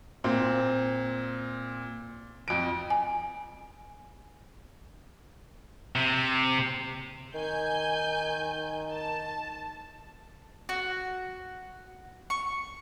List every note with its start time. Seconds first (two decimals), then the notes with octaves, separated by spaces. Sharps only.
0.24 A#2 C4
2.48 F2 D7
2.90 G#5
5.96 C3
7.35 D#3 G#5 G6
8.91 A5
10.69 F#4
12.30 C#6